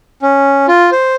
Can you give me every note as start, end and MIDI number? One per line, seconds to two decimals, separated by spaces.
0.22 0.67 61
0.68 0.90 65
0.92 1.16 72